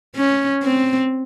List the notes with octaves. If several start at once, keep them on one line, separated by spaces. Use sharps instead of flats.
C#4
C4